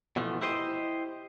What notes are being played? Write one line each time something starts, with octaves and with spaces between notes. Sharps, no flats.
B2 E3 F3 A3
E4 G4 C5 D#5